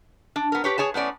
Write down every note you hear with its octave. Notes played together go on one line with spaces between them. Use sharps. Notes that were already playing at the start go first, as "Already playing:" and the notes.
D4
B3 A#4
G4 B4 C#5
G#4 C#5 G#5 A5
A2 B3 C#4 D5